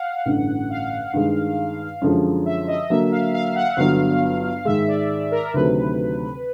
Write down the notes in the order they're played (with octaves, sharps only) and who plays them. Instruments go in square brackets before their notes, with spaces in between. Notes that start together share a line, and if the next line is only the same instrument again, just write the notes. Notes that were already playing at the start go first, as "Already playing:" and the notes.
Already playing: [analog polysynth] F5 F#5
[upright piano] A1 G2 D3
[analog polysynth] F5
[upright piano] G2 D#3 G#3
F#2 D3 F3 G#3
[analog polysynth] E5
D#5
[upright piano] D3 F#3 A#3 [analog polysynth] E5
[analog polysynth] F5
F5
F#5
[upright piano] G1 G2 D3 F#3 B3 [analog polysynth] F5
[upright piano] G#2 D#3 G#3 [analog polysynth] E5
[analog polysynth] D5
A#4
[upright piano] D2 C3 D#3 F#3 A3 [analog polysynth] B4